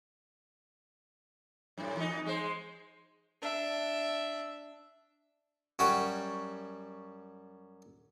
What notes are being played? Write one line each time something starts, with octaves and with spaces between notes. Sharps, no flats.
F#2 A2
E2 D#4
G#3 C5
D4 E5
F#2 G3 F#4 G4 C#5